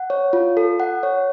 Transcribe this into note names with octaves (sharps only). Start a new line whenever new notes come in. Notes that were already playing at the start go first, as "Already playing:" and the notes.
Already playing: F#5
C#5
F4
A4
F#5
C#5